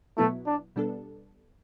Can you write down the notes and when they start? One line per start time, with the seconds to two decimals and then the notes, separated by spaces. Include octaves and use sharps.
0.17 B2 F#3 A3 B3 E4
0.47 D4
0.76 B2 G3 B3 D4 A4